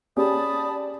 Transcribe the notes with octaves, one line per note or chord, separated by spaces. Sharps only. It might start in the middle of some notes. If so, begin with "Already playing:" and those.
C#4 G4 G#4 D5 A5 B5 D#6